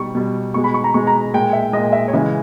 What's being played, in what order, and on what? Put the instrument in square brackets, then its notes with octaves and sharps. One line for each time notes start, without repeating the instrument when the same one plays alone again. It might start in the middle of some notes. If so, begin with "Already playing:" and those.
Already playing: [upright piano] B2 G3 C#6
B2 G3
B2 G#3 C#6
B5
C#6
A#5
B2 G#3 C#6
A#5
A#2 G#3 G5
E5
A#2 G#3 D#5
E5
C#5
C#3 E3 G#3 D#5